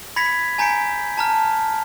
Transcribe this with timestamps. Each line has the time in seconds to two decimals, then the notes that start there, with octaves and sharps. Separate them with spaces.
0.16 B5 G#6 A#6 B6 C#7 F7
0.58 G#5 A#5 G6 B6 C#7 D7
1.18 A5 A#5 F6